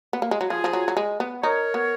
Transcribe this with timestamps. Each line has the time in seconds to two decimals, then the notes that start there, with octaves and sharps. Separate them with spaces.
0.13 B3
0.22 A#3
0.31 G#3
0.41 F#3
0.50 F3 F4 G#4
0.64 F3
0.73 F#3
0.88 F#3
0.97 G#3
1.20 B3
1.43 D#4 A#4 C#5
1.74 B3